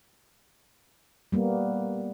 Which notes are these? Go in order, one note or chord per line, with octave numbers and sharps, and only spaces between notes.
G3 A#3 B3